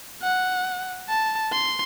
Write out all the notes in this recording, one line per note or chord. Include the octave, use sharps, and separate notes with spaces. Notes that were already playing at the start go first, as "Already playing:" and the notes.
F#5
A5
C6